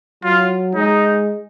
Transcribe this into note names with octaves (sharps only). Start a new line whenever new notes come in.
F#3 F4
G#3 D#4